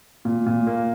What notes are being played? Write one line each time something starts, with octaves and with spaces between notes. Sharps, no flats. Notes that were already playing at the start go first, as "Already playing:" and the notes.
A#2
A#2
A#3